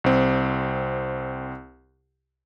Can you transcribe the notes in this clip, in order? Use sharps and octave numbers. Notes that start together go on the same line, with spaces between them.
C2 C4